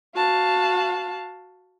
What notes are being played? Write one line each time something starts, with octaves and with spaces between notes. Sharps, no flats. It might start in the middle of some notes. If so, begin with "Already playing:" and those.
F#4 F5 A5